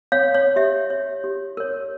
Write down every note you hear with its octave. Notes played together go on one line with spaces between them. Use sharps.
C#5 F5
C#5
C#5
G4 E5
C#5
G4
A#4 C#5